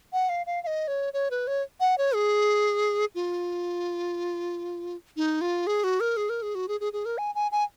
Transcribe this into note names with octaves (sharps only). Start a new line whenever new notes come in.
F#5
F5
F5
F5
D#5
C#5
C#5
B4
C#5
F#5
C#5
G#4
F4
D#4
F4
G#4
F#4
A#4
G#4
A#4
G#4
F#4
G#4
G#4
G#4
A#4
G#5
G#5
G#5